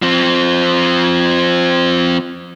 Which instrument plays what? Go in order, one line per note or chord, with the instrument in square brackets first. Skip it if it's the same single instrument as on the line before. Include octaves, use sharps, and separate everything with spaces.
[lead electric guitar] F3 C4